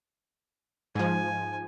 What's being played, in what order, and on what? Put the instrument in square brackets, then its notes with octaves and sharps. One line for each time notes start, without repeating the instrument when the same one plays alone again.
[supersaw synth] G#2 F3 [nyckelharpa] G#5